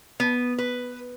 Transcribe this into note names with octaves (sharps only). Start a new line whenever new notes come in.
B3
B4